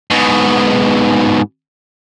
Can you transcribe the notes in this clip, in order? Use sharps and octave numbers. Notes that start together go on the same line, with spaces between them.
G#2 B2